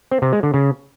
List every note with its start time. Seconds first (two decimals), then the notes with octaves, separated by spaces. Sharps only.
0.11 C4
0.22 C3
0.33 G#3
0.43 D3
0.54 C#3